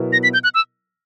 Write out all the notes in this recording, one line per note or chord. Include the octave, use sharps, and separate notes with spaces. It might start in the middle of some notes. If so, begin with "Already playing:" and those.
Already playing: B2 F#3 B3 E4 A#4
A#6
B6
G6
F#6
E6